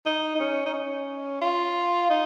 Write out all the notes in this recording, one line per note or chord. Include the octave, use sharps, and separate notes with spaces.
D#4
D#4
C#4
D#4
C#4
F4
D#4